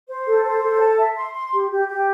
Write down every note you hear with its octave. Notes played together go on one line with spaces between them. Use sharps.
C5
A4
C5
A4
A5
E5
C6
C6
G4
G4
G4